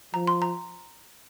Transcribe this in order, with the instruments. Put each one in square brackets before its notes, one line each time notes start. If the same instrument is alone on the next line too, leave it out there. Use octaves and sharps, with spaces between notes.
[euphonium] F3 [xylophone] A#5
[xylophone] C6
A#5